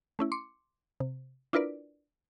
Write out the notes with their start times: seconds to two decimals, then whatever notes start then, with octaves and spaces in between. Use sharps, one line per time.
0.19 A3 C#4 E4
0.32 C6 D6 C#7
1.00 C3
1.53 D4 E4 F4 A#4 B4 D5